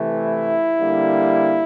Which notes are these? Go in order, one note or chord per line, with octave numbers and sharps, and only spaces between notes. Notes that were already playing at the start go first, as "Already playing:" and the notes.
Already playing: C3 E3 A3
E4
D3 G3 A#3